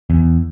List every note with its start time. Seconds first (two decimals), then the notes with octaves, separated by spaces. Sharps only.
0.10 E2